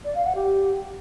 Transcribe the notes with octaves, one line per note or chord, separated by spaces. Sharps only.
D5
F5
F#5
G4